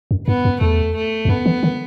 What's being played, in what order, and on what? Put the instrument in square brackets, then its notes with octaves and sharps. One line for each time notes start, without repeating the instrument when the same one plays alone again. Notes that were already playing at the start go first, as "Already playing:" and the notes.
[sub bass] F#2
[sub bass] G2 [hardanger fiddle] B3
[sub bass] F#2
[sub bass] E2 [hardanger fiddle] A3
[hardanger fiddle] A3
[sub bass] E2
[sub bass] F#2 [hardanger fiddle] B3
[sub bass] E3
D#3